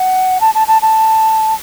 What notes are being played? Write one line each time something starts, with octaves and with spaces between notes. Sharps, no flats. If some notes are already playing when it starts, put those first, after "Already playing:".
Already playing: F#5
A5
A5
A5
A5